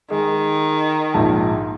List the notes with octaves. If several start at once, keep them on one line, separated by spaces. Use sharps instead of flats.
D#3 G#3
A#1 G#2 A5